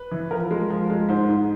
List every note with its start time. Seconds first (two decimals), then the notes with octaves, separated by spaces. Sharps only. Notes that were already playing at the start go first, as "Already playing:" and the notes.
Already playing: B4
0.11 E3
0.31 F3 A#4
0.51 G#3
0.70 F3
0.90 G#3
1.09 G#2 C5
1.29 G#2